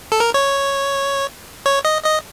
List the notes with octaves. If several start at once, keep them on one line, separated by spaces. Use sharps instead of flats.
A4
A#4
C#5
C#5
D#5
D#5